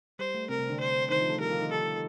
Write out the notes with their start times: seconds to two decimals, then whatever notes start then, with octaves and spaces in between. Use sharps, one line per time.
0.19 G3 C5
0.35 A3
0.49 C3 C4 A#4
0.59 C3 C4
0.69 D3 D4
0.80 C5
1.10 D#3 D#4 C5
1.21 F3 F4
1.30 A3 A4
1.40 G3 G4 A#4
1.51 F3 F4
1.61 D#3 D#4
1.72 A4